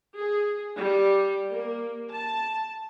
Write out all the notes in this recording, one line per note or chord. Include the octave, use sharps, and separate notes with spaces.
G#4
G3
A#3
A5